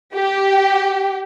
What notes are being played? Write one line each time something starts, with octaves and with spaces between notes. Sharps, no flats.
G4